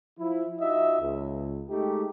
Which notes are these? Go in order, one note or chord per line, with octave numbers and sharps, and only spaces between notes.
F3 E4
D#4 F4 F#4 D#5 E5
C#2
G#3 A3 D#4 G4